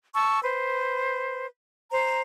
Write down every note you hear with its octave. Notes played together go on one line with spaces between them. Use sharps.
A5 C#6 E6
B4 C5
C5 A#5